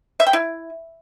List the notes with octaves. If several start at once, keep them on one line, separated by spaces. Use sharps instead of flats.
E5
G5
E4